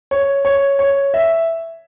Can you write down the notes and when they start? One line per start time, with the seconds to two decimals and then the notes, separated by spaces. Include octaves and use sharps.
0.11 C#5
0.45 C#5
0.79 C#5
1.14 E5